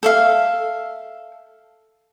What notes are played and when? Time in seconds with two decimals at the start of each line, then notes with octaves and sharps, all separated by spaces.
0.03 A4 E5 F5